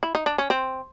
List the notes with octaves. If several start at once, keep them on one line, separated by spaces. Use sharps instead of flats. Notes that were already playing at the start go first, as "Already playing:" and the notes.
E4
D#4
D4
C#4
C4